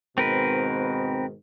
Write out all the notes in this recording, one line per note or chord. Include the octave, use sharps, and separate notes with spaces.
G#2 B2 D#3 C4 A#4 B4